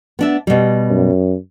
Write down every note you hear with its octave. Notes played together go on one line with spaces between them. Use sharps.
B3 D4 E5
B2 G3
F#2